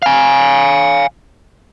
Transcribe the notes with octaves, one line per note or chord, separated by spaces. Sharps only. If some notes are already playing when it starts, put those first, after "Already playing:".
F5 G#5